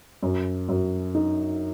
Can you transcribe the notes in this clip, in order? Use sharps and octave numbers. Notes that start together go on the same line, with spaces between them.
F#2
F#2
D#4